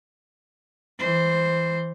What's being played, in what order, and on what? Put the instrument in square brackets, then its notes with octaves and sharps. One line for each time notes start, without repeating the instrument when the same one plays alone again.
[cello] E3 C5